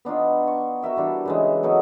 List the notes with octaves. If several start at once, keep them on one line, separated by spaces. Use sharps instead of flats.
B3 D4 D#4 F4
C#6
F#4 A#4 E5 G5
E3 G3 D4
C#3 E3 G#3
F#3 B3 D#4 A4